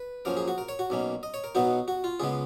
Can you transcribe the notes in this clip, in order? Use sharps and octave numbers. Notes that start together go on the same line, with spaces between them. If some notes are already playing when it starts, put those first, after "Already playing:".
Already playing: B4
F#2 F3 A#3 C#4 A#4
G#4
F#4
A#4
C#5
F#4
B1 B2 A#3 C#4
D#5
C#5
A#4
B2 F#3 B3 D#4 F#4
F#4
F4
C#2 C#3 G#3 B3 G#4